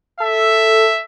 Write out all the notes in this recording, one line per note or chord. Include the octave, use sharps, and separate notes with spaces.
A4 E5